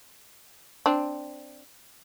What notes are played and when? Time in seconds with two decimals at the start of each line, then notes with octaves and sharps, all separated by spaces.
0.86 C4 D4